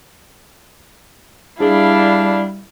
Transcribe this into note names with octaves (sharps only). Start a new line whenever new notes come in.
G3 D4 E4 G#4 F5